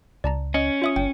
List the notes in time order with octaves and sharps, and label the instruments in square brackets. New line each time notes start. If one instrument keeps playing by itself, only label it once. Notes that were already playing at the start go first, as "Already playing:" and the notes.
[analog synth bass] C#2 [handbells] D5 A5 A#5
[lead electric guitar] C#4 [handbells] D#5
[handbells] F4 E5 D#6
[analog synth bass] G1 [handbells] G5